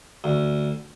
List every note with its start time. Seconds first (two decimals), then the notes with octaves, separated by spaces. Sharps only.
0.24 D2